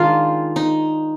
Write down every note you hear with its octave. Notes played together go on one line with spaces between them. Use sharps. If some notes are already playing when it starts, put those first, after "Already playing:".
Already playing: D#3 G#3 D4 F4 A#4
D#4